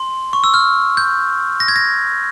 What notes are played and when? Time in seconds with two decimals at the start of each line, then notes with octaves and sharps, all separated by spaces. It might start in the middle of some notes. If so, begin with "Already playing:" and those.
Already playing: C6
0.33 C#6
0.44 E6
0.54 F6
0.97 G6
1.60 A#6
1.68 G#6
1.76 A#6